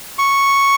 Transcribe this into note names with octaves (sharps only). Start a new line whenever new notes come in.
C#6